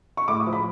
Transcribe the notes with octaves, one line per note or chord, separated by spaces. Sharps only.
C#6
A2 D6
D#6
F3
B5